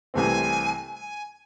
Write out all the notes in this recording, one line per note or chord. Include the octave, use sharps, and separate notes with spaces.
C2 C3 E3 A3 C4 G#5
G#5